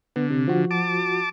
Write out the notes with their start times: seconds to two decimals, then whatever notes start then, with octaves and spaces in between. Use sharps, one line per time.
0.16 D3 B3
0.30 C3
0.48 F3 F#4
0.71 A5 D6